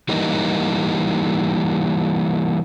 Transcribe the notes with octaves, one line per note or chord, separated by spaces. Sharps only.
E3 G3 A#3 D#4